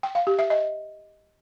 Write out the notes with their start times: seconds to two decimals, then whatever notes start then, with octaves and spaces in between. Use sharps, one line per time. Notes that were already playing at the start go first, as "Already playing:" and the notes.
0.03 G5
0.15 F5
0.27 G4
0.39 E5
0.50 D#5